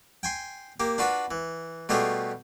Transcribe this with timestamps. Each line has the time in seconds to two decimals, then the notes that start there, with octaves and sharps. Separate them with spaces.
0.23 G5 G#5 C6
0.80 A#3 G4
0.98 D4 F4 F#4 B4 B5
1.31 E3
1.89 B2 G3 A3 F4 G4 G#4